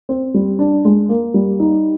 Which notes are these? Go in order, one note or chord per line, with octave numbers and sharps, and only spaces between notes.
C4
G3
D4
G#3
A#3
G3
D#4